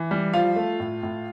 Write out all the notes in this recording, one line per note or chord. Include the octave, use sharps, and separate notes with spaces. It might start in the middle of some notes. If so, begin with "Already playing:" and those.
Already playing: E3
G3
F3 F4 F5
A3
A2
A2